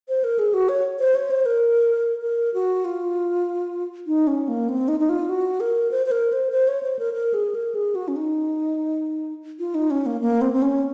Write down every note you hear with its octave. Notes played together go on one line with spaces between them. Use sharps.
C5
A#4
G#4
F#4
C#5
C5
C#5
C5
A#4
A#4
F#4
F4
D#4
C#4
A#3
C4
D#4
D#4
F4
F#4
A#4
C5
C5
A#4
C5
C5
C#5
C5
A#4
A#4
G#4
A#4
G#4
F#4
C#4
D#4
F4
D#4
C#4
A#3
A#3
C4
C4
C#4